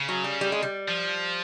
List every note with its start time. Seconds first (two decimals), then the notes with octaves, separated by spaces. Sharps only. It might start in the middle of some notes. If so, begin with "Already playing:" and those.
Already playing: C#3
0.09 F#3
0.24 G3
0.41 G3
0.52 G#3
0.63 G3
0.88 F3